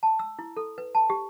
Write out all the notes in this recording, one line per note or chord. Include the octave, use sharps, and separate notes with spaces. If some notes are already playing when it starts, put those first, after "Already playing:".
A5
E6
E4
A4
B4
A5
G4